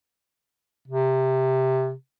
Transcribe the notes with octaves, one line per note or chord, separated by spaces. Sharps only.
C3